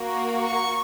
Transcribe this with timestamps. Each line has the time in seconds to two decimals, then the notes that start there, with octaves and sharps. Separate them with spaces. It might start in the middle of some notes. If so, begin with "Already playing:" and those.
Already playing: A#3 F#4
0.41 C#6